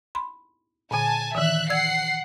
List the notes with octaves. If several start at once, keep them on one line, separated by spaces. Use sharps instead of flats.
B5 C6
A#2 D3 G#5 A5
D#3 E3 E5 F#6
D5 F#5 E6 G#6 C7